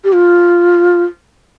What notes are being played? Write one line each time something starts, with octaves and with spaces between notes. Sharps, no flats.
G4
F4